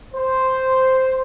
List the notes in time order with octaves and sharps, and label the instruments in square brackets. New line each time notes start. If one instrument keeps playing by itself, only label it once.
[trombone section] C5